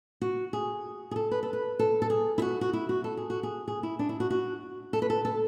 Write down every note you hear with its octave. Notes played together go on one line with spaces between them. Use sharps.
F#4
G#4
G#4
A4
B4
A4
B4
A4
A4
G#4
E4
F#4
F#4
E4
F#4
A4
G#4
F#4
G#4
G#4
E4
D4
E4
F#4
F#4
A4
B4
A4
A4